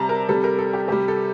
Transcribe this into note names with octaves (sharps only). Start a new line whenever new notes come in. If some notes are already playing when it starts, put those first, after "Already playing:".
Already playing: C3 G3 A5 A#5
A#4
C3 G3 A4
A#4
A4
G4
C3 G3 G4
A4